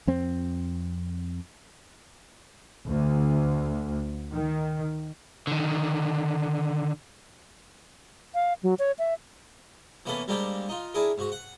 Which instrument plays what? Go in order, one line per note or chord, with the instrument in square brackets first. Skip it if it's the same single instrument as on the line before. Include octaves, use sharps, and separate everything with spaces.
[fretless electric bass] F2 C4
[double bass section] D2
D#3
[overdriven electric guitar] D3 D#3
[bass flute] F5
F#3
C#5
E5
[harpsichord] E3 A#3 B3 C#4 A4 B4
G3 G#3 A#3 C4 D4 G4
D#4 F4
D4 E4 G#4 A#4
G#2 F#4
F#5